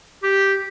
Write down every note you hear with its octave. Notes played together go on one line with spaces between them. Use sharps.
G4